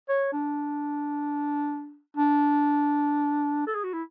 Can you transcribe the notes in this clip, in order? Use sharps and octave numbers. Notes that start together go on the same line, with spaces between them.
C#5
D4
D4
A4
G#4
F#4
E4